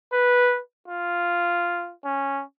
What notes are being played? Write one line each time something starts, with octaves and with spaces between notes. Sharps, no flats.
B4
F4
C#4